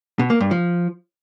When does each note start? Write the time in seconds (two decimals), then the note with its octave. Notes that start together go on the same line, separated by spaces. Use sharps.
0.19 B2
0.30 A#3
0.40 G2
0.51 F3